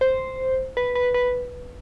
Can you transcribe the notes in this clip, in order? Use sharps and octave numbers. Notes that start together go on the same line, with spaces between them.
C5
B4
B4
B4